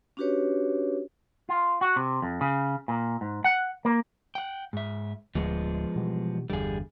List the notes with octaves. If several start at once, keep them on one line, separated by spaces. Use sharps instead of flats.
C#4 D4 F#4 G4 B4 C#5
F4
F#4
C3
F2
C#3
A#2
G#2
F#5
A#3
F#5 G5
G#2 E5
D1 D2 F3 G#3 B3
B2 E3 G3
G1 E2 D3 G3 G#4